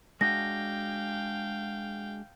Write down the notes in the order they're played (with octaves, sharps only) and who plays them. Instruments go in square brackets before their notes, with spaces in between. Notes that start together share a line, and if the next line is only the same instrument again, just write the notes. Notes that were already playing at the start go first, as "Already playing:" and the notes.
[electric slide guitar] G#3 D4 F#4 [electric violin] F5 G5 [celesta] A#6